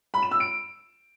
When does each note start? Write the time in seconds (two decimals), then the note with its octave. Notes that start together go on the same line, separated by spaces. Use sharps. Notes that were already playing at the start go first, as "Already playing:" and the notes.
0.14 B5
0.23 E7
0.31 E6
0.40 D7